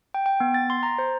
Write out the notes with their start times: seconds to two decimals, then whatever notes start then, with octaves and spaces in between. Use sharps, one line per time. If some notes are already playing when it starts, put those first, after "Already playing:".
0.14 G5
0.26 G5
0.40 B3
0.54 A6
0.70 C6
0.83 A#5
0.98 C5